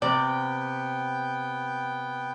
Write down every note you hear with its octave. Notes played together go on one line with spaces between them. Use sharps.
C3 B3 D5 G5